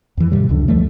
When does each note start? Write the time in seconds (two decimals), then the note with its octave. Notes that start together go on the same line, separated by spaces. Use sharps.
0.17 F2 E3
0.32 G#2 C3 D#3 G3
0.49 C#2 F#2 D3
0.68 E2 F3 G3 A3